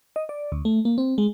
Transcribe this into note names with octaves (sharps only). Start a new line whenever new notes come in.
D#5
D5
D2
A3
A#3
C4
G#3